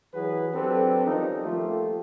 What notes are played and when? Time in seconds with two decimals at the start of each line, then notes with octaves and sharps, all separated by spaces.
0.14 E3 F#3 F#4 G#4 B4
0.54 F#3 C4 D4 G4 A4 B4
1.07 D#3 F3 G3 C#4 D#4
1.44 F3 A3 A#3 F4 G4 A4